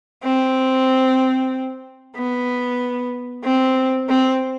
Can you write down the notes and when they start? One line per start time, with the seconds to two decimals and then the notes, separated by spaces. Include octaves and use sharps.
0.24 C4
2.16 B3
3.44 C4
4.09 C4